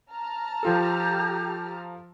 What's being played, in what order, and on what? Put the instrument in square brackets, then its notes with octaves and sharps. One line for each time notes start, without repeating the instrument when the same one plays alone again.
[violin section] A5 A#5 F6
[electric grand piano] F3 F4 A4 [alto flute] G4